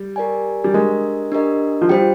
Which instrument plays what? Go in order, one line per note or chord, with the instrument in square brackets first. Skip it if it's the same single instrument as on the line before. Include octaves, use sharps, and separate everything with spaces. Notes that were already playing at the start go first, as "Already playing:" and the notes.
Already playing: [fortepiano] G3
[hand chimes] G4 A#4 D5 G#5
[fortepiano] G3
[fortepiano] G#3 [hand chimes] D4 G4 A#4 D#5
[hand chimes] D4 G4 A#4 D#5
[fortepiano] F3
[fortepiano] G3 [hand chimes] F4 C5 G5